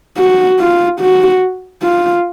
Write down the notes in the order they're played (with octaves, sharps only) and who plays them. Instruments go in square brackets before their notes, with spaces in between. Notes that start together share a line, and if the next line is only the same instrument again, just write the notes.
[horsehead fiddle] F#4
F4
F#4
F4